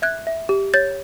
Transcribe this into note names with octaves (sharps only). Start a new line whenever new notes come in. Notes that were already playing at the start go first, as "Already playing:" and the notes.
E5 F#6 G#6
E5
G4
C#5 G6 A6